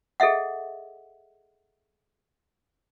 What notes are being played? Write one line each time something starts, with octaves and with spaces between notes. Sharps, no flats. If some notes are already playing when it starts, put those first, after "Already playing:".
G#4 A4 D#5 E5 F#5